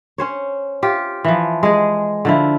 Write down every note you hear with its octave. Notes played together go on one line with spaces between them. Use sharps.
C#4 C5 C#5
F4 G4
E3 F3
G#3 G#4
D3 F3 E4